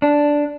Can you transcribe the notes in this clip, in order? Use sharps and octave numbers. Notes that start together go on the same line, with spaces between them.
D4